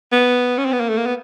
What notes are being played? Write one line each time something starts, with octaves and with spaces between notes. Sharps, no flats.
B3
C#4
C4
B3
A#3
A3
A#3
B3